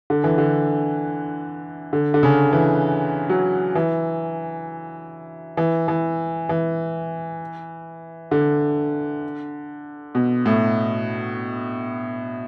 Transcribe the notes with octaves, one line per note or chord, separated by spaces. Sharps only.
D3
E3
D3
D3
D3
C#3
E3
F#3
E3
E3
E3
E3
D3
B2
A2